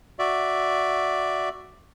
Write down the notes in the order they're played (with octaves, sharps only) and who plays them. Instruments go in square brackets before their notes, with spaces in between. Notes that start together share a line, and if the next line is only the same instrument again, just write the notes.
[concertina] F#4 D5 E5